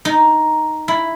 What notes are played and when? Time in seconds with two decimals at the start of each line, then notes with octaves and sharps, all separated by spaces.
0.05 D#4
0.88 E4